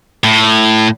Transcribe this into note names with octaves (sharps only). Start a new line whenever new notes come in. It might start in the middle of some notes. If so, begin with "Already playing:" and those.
A2